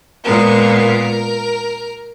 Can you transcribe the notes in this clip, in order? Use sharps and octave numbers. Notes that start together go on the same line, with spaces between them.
A#2 G#3 B3 A#4
A#4